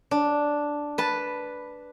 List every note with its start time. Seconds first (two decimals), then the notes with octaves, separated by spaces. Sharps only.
0.11 D4
0.98 B4 A5